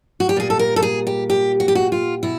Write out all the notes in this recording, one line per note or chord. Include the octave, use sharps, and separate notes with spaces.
F#4
G4
A#2 G3 G#4
A4
A#4
A4
G#4
G4
G4
F#4
G4
F#4
F4
B2 E4